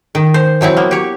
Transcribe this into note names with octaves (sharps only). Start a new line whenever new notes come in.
D#3
C5
E3 F#3 C4 E4
A#3 B3
G4 C#5